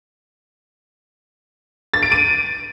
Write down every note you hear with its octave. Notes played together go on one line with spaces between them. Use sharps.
A6
D7
D#7